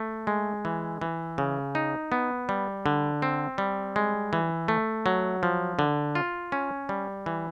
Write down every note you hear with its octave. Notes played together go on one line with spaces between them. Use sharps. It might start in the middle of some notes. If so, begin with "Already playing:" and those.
Already playing: A3
G#3
E3
E3
C#3
D#4
B3
G3
D3
C4
G3
G#3
E3
A3
F#3
F3
D3
F4
C#4
G3
E3